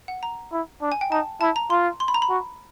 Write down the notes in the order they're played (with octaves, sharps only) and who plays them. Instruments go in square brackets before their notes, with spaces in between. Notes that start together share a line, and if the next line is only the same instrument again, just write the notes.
[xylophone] F#5
A#5
[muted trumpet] E4
D4
[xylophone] G#5
G5
[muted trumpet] D#4 [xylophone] A5
[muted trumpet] E4 [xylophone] A5
[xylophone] A#5
[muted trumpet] F4 [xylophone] C6
[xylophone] C6
B5
A#5
B5
[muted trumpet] F#4